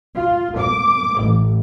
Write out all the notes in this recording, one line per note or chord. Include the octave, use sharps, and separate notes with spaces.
F4
D6
A1